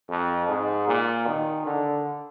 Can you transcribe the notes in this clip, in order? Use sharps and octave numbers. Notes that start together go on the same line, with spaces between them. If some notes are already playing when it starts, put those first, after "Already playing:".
F2
G#2
A#2
D#3
D3